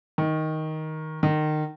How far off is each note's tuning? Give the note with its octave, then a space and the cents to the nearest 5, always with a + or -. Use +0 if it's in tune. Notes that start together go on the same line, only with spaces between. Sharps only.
D#3 +10
D#3 -25